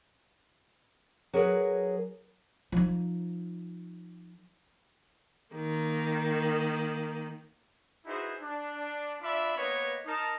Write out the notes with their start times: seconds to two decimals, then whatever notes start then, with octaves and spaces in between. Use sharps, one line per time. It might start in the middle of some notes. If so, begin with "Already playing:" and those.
1.33 F#3 G#4 A#4 B4
2.72 F3 D#4
5.54 D#3 A#3
8.06 D#4 E4 F#4 G#4 B4 C5
8.40 D4
9.21 D4 F4 D5 E5 B5
9.56 A#3 B3 B4 C#5 D#5
10.06 D#4 A#4 A5